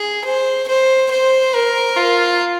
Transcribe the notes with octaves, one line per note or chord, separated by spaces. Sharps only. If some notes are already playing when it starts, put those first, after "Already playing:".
Already playing: G#4
C5
C5
C5
A#4
F4